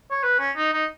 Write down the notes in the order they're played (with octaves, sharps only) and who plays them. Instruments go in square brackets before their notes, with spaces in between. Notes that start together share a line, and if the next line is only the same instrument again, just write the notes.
[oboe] C#5
B4
C#4
D#4
D#4